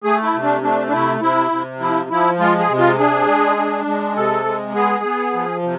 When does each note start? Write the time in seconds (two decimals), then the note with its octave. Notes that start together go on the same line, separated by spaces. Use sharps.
0.04 A3 G#4
0.23 E4
0.34 C3
0.43 D4
0.63 A3 D4
0.87 D4
0.92 C3 E4
1.21 C3 E4
1.51 C3
1.80 F3 E4
2.10 F3 E4
2.40 G#3 F4
2.59 G#4
2.69 C3
2.78 F4
2.98 D4 G#4
3.27 G#3
3.57 D4
3.86 G#3
4.16 C3 A4
4.46 G#3
4.75 B3 G#4
5.04 B3
5.33 F3
5.63 C3